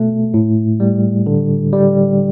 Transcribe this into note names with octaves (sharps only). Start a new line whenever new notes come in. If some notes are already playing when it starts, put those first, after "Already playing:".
Already playing: B2 A3
A2
G3
D3
G3